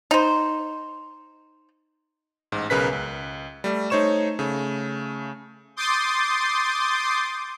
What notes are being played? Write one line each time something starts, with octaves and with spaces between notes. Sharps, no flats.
D#4 C5
A1 G#2
B1 C#3 A#4 B4 F#6 B6
C#2
G3 A3
A3 D#4 C5 C#5 C#6 E7
C#3 A3
C6 D6 D#6 G6 A6 C7